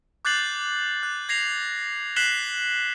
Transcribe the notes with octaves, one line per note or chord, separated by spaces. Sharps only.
D6 F#6 G6 A6 C7 F#7
F#6
G#6 A#6 C7 F7
F#6 B6 C7 E7 F#7 G7